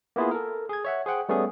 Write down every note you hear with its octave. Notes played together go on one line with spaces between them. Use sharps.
A#3 B3 E4 F4 G#4
A4 A#4
G#4 G#6
C#5 E5 F#5
G#4 C5 F#5 G5
G3 A3 B3 C#4 G#4